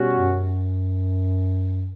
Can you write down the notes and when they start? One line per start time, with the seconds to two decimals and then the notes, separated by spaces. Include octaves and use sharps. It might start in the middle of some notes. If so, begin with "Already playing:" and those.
Already playing: B2 G3 C#4 F#4
0.13 F#2